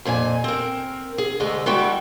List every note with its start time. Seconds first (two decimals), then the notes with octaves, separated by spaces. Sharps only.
0.05 F2 A#2 A4 G#5
0.44 C4 A#4
1.18 G#4
1.40 D2 C3 G#3 A3 D#5
1.66 G3 G#3 E4 F#4 G5